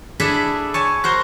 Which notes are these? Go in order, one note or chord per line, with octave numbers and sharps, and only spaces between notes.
D4 E4 G#4 A4 E5 B5
C#5 G#5 A5
F#4 A#4 C5